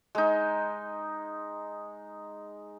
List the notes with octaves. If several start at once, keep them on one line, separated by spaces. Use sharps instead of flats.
G#3 D#4